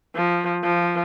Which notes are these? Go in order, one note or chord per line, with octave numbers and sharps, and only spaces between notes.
F3
F3